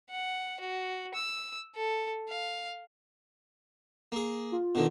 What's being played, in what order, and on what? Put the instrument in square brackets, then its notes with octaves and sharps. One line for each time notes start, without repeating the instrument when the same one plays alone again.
[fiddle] F#5
F#4
E6
A4
F5
[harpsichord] A#3 G#4
[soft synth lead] F4
[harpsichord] B2 D3 D#3